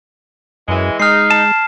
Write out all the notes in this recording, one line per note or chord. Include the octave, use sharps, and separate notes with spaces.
F#2 E3 G#3
G#3 D#4 F6 C7
A5